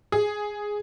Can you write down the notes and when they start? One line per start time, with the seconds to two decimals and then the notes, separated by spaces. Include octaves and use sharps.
0.12 G#4